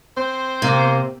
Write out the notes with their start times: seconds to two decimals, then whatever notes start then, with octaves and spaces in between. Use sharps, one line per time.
0.17 C4 C5
0.62 C3 A#3